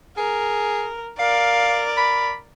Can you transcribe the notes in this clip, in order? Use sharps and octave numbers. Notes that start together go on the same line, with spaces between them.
G#4 A#4
A#4 D5 F5
B5